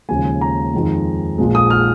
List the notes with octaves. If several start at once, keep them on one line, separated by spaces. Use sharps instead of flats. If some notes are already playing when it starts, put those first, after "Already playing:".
D#2 C#3 F3 G#3 G#5
A#5
F2 D#3 G#3
A#1 A#2 F3 G#3
D#6
F6